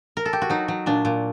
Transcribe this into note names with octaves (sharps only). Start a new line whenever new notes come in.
A#4
A4
G4
F#4
F#3 D#4
F#3
A#2 D4
A#2